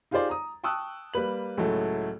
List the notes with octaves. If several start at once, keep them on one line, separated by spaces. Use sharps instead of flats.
D#4 F4 G4 G#4 C5 D5
A#5 D#6
G5 A5 C#6 D#6 E6 F#6
G3 A#3 B4 F#7
C#2 A2 F#3 A3